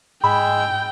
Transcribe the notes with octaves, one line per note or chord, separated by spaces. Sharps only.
G#2 G#3 G#4 G5 B5 E6